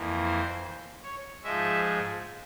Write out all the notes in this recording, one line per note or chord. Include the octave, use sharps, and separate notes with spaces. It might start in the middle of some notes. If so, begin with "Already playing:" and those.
Already playing: F2 E3 A#3
C5
C#5
G#2 F3 G#3 E5